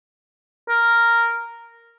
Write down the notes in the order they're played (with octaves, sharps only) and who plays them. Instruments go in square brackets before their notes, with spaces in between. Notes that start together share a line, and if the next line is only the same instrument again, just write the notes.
[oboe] A#4